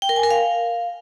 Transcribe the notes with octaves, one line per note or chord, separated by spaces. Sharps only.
G5
A#4
G#5
A#4
F5